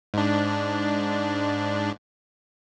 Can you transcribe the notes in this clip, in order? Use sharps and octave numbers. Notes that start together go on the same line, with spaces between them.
G#2 D4